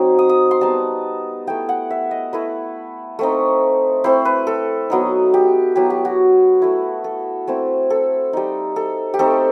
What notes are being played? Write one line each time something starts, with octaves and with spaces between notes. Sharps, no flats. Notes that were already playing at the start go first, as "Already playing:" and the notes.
Already playing: F#3 C4 D#4
D#6
D#6
C6
G3 B3 D#4 A5
A3 E4 G5
F#5
E5
D#5
A3 E4 B4
A3 C4 D#4
A3 C4 E4 C5
B4
A4
F#3 B3 D#4
G4
F#3 B3 E4 G4
G4
F#4
A3 E4
A4
A3 C4 E4
A4
G3 D#4
A4
G4
A3 C4 D#4 A4